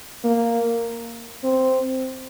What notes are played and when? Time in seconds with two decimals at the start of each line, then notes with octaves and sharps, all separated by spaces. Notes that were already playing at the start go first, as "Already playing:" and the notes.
0.24 A#3
1.44 C4